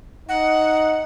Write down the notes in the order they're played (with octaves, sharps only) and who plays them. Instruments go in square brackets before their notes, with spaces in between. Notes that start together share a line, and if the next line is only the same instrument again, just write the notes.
[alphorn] D#4 [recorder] F#5